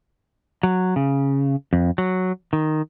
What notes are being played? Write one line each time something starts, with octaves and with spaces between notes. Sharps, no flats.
F#3
C#3
F2
F#3
D#3